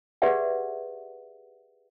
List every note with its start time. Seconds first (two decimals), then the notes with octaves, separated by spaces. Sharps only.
0.22 G4 G#4 B4 D5 E5 F#5